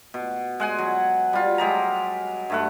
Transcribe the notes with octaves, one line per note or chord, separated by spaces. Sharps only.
B2
G#3 F#5 G#5
F#3
G3 F4
F#3 G#3 G4 A#5
G2 A3 F#5